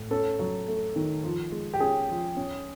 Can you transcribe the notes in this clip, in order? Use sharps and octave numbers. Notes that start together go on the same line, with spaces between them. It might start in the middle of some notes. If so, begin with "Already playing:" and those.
Already playing: A2
C#4 A4
F#3
A3
D#3
F3
G#3
G4
C#4 G#4
F3
C#4